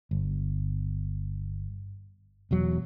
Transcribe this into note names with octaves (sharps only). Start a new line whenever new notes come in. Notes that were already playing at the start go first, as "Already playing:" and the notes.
G1
E1 E2 F#3